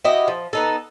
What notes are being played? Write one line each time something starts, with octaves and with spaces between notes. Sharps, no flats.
E4 F#4 G4 D#5
F3
B3 D#4 A4